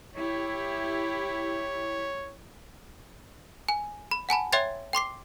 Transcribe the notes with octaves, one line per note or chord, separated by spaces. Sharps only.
E4 G4 C#5
G#5
B5
F#5 G#5 A5 B5
C#5 E5 G5 C6 G#6 A6
G5 C6 D6 C7